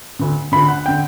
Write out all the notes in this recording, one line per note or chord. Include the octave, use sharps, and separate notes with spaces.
D2 D3
D2 D3 B5
F#5
D3 G5